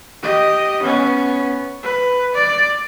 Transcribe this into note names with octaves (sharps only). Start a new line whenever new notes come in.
G4 D#5
B3 C#4
B4
D5